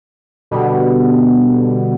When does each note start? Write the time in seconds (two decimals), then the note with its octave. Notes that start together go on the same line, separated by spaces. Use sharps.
0.51 B2 D3 G3 B3